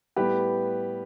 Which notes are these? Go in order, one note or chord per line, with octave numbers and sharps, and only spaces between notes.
A2 G3 B3 G4 B4